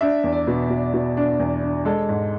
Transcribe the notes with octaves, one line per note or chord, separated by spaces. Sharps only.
D4 E5
E2
D5
B2
B2
B2
D4
E2
D4
G#3 A4
G#2